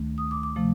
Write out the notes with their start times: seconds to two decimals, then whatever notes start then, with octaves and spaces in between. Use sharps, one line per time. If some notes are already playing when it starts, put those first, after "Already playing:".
Already playing: D2 D#3 A3
0.18 D#6
0.31 D6
0.43 D6
0.56 C3 F3 A3